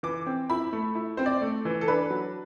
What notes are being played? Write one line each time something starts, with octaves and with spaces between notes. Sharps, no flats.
E3 D6
C4
E4 B5
A3
E4
C4 C5
D5
A3
E3
A4
D4 B4
F#3